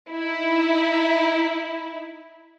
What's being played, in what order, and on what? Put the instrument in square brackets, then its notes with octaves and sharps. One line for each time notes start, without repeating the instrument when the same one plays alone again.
[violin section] D#4 E4